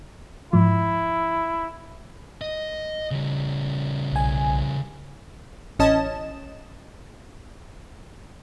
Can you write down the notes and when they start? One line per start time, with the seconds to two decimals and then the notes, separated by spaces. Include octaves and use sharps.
0.53 G#2 F3 E4
2.41 D#5
3.11 C#3 G3
4.12 B1 G#5
5.79 A1 C#4 D#5 A5 E7